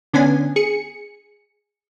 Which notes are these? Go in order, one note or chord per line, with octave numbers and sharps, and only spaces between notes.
D3 B3 C#4 D4 G#5
G#4 C#7